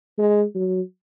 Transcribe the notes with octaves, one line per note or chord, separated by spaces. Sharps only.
G#3
F#3